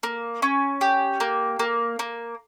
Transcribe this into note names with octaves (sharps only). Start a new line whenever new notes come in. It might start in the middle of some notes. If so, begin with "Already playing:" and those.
A#3
C#4
G4
A#3
A#3
A#3